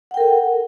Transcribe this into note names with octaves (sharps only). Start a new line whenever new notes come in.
A4 A#4 F#5 G5